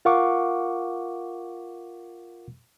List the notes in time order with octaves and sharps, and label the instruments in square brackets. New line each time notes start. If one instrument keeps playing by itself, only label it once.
[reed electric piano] F4 A#4 F5 F#5 C#6 D6